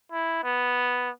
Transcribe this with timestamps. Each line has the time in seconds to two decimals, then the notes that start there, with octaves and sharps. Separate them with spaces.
0.12 E4
0.44 B3